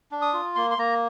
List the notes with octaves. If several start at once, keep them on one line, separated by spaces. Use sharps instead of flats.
D4
D#6
F4
A#3 C6
C6
A#3 A#5